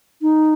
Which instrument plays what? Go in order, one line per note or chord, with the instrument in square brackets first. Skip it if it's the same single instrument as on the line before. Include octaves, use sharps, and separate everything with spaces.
[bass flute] D#4